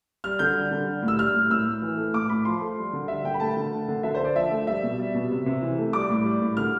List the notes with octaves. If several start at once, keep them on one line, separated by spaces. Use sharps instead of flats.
G3 F6
D3 G6
G3
D3
G3
A2
E6
G3 F6
A2
A2 E6
A2
E3
A3
A2 D6
A2 B5
F3 C6
A3
G3
D3
G3 E5
D3 G5
B5
A3 A5
D3
A3
D3
D3 E5
C5
D3 D5
F3 E5
A3
G3 E5
B2
G3
B2
C3
C3
E3
A3
G3 D6
A2
G3
A2
D3 F6